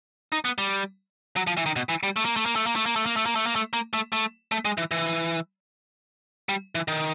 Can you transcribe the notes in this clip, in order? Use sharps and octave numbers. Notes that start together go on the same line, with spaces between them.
D#4
B3
G3
F#3
F3
E3
D#3
B2
E3
G3
A3
A#3
A3
A#3
A3
A#3
A3
A#3
A3
A#3
A3
A#3
A3
A#3
A3
A#3
A3
A3
A3
G#3
E3
E3
G3
E3
D#3